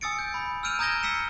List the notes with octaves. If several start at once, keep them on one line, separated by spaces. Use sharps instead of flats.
G#5 D#6 E6 A6 C#7 D7
G6
B5
E6 F6 G6 D7 D#7 F7
A#5 D#6 G6 G#6 A#6 G7
E6 B6 C#7 E7